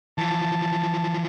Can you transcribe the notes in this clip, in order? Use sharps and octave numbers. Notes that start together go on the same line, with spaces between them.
E3 F3 A5